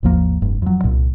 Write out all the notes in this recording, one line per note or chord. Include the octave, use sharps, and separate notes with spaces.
G#1 D#2 F3 A#3
F1 G2
F2 F#3
C2 A#2